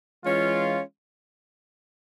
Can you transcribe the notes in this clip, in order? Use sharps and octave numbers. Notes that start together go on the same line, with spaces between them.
E3 G#3 C#4 F4